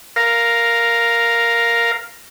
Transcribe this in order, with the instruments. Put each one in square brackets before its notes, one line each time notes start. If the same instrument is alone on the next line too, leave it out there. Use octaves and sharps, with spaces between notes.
[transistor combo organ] A#4 F5